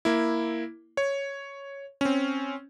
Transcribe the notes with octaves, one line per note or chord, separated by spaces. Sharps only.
A#3 E4
C#5
C4 C#4